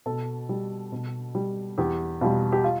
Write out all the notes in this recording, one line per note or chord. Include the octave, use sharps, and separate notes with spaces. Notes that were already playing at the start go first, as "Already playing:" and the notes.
B2 A4
G3
B2
G3
E2 G4
B2 G3 F4
G4
F4